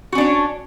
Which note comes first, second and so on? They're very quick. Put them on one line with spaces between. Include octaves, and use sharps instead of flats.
F#4 C#4 D4 C#5